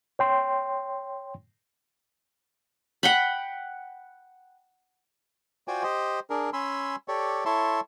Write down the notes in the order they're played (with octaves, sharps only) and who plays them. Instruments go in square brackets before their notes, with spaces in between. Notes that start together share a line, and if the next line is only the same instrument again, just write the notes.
[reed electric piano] C#5 G5 C6
[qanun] F#5 G5 B5
[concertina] F4 F#4 C5 D5 G5 G#5
G4 C5 D#5
D4 G#4 A#4
C#4 G#5 B5 C6 E6
G4 A4 C#5 D5
E4 A4 C#5 E5 A5 C6